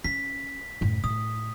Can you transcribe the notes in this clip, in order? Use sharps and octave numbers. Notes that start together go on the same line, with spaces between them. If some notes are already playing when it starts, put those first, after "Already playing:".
C#4 B6
F#2 A2
A2 D#6